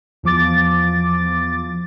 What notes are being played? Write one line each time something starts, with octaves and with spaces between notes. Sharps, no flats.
E2 F3 D6 A6